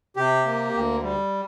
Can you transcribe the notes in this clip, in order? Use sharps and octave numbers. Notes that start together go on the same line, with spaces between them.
C3 G4
A#3
D2
G3